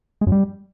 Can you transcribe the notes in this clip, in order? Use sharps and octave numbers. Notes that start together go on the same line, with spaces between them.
G#3
F#2
G3